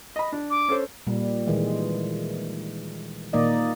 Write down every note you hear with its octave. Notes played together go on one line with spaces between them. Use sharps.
D#5 B5
D4
D6
C#4 A4 C5
A#2 G3
A#2 D#3 E3 G#3
A#2 D#3 A#3 D#4 D5 D#5